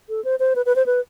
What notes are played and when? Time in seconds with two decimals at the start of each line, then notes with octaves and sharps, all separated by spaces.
0.09 A4
0.25 C5
0.40 C5
0.56 B4
0.66 B4
0.76 C5
0.86 B4